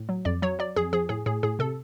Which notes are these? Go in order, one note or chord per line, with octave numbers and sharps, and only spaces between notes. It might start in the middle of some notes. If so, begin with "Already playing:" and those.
Already playing: A2
F#3
F2 D5
F#3 C#5
F#3 D5
F2 G#4
F3 G#4
A2 G#4
A2 G#4
A2 G#4
C3 A4